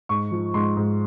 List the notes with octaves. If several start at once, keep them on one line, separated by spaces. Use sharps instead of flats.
G#2 C#6
F3
G#2 C6
G#2